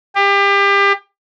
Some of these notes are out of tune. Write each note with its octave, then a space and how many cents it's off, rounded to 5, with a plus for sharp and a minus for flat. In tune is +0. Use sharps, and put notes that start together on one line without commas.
G4 +30